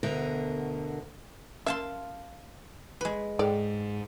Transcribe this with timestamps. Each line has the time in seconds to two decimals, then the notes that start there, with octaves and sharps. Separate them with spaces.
0.03 D2 B2 D3 A#4
1.66 C#4 A#4 E5 F5 A5 C6
3.01 G#3 B4
3.39 G#2 G#4 A4 D5 G5